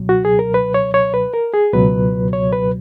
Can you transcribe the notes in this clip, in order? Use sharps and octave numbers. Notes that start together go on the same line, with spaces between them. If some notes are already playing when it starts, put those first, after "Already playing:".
Already playing: C#2 B2 F#3
F#4
G#4
A#4
B4
C#5
C#5
B4
A#4
G#4
C#2 B2 F#3 B4
C#5
B4